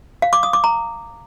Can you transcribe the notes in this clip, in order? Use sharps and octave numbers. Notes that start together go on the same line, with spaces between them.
F5
D6
D#6
D6
A#5